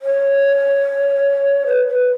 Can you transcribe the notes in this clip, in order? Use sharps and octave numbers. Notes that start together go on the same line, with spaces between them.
C#5
B4
B4